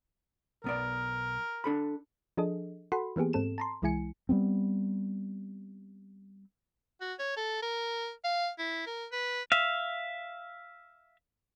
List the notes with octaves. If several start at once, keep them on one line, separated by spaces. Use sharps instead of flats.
B1 B3 A#4 D5
D4 A4 B5
F3 D4 G#4 A4 D#5
F#4 A4 F#5 B5 C6
E3 A#3 B3 G4 G#4
G#2 C4 A4 E7
A5 A#5 C6
C2 E3 G#3 E4 G#5 C#7
G3 G#3 B3 C4
F#4
C#5
A4
A#4
F5
E4
A#4
B4
E5 F5